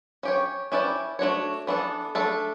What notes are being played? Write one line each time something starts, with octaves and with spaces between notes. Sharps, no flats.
C#4 G4 C#5
C#4 E4 G4 B4 D5
A3 D4 F#4 C#5
E3 B3 D4 A4
A3 D4 A4